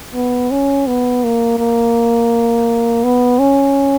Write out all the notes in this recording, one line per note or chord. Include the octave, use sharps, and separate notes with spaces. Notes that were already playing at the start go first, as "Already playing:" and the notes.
B3
C#4
B3
A#3
A#3
B3
C#4